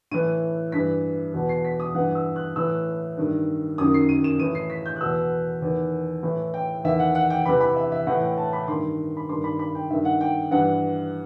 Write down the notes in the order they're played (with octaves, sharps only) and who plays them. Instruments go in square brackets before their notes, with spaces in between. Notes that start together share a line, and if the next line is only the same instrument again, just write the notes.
[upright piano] A2 E3 D#7
G2 E3 B6
E2 B2
C7
B6
D#6
G2 E3 F#5
E6
F#6
A2 E3 E6
G2 D#3
F#2 D#3 D#6
C7
D#7
E7
A2 E3 D#7
C7
B6
G6
F#6
E2 B2 E6
E2 D#3
A2 E3
G5
E2 D#3 E5
F#5
F#5
G5
E2 C3 E3 B5
B5
E5
E5
A2 E3 F#5
G5
A5
B5
G2 D#3 C6
B5
G2 D#3 C6
B5
B5
G5
G2 D#3 E5
F#5
G5
G2 E3 F#5